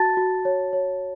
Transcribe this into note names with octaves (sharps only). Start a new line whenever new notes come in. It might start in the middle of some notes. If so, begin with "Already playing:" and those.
Already playing: F#4 A5 A6
F#4
C#5
C#5